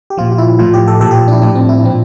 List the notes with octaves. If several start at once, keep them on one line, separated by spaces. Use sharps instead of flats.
G4
A#2 F3 F4
F4
E4
A2 F3 F4
G4
A4
A#2 F3 A4
G4
D4
E4
A2 F3 D4
C4
E4
D4
A#2 F3 C4